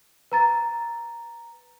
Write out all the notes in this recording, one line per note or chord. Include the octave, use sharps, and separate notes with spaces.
B4 A#5 A6